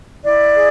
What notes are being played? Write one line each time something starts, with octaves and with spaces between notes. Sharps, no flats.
E4 D5
G#4